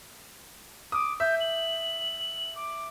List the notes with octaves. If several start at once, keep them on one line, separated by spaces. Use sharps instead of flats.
D6 D#6
E5 G6
F#7
D6